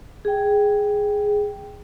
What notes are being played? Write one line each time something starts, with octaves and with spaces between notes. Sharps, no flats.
G#4 G5